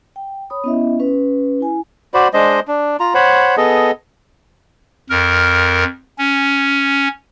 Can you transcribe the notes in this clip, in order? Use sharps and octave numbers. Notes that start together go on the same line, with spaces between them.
G5
C#5 B5 D#6
B3 C#4 E4 D#5 E5
C#4 B4
E4 G#5
F#4 C5 D5 B5
G#3 D4 C5 D#5
D4
F4 A#5
C5 C#5 F#5 B5
B3 G#4 A4 D#5
F2 A#4
C#4